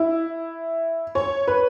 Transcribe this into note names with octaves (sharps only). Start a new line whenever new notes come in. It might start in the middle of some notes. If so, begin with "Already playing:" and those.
Already playing: E4
C#5
B4